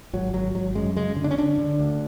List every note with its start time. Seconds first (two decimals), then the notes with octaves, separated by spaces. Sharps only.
0.13 G#1 F#3
0.34 G#1 F#3
0.55 G#1 F#3
0.75 F#2 G#3
0.97 C#3 G#3
1.16 D3
1.24 D4
1.31 C#4
1.37 D3 D4
1.58 D3
1.79 D2